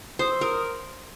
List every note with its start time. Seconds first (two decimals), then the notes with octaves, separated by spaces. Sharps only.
0.19 C5 D#6
0.31 E6
0.41 A#4 D#6